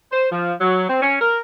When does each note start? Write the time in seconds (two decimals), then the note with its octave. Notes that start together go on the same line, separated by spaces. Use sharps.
0.11 C5
0.32 F3
0.61 F#3
0.89 C4
1.02 C#4
1.21 A#4